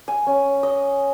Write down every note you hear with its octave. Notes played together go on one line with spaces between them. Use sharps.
G#5
C#4
D#5